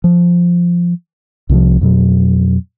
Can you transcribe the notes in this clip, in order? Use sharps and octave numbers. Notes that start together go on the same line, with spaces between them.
F3
C2 C3 D#3 F3
F2 B2 F#3